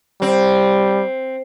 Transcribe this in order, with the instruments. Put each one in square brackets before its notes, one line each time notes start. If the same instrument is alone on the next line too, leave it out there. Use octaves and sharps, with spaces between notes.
[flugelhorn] G3 [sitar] C4